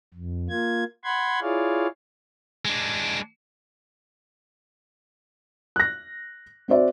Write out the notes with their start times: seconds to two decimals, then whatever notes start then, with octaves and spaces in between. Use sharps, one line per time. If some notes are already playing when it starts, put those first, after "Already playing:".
0.14 F2
0.50 A#3 F4 G#6
1.04 F#5 B5 C6 G#6
1.41 E4 F4 G#4 C#5 D5 F5
2.65 G#3 D4
5.76 F#6 A#6
6.68 C4 F#4 C5 D5 E5